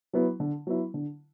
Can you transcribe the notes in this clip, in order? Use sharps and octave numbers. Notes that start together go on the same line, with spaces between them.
F#3 B3 E4
D3
F#3 B3 E4
D3